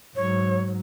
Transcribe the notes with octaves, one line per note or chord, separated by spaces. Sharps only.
G#2 F#3 C#5